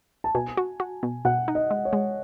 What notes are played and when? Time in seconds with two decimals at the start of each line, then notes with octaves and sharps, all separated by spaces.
0.24 A5
0.35 B2 G#5
0.57 F#4
0.80 F#4
1.03 B2
1.25 B2 F#5
1.48 D#4
1.55 D#5
1.71 G#3
1.85 C#5
1.93 G#3